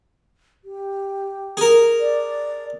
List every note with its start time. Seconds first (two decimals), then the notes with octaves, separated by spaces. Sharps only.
0.64 G4
1.57 G#4 A#4
2.00 D5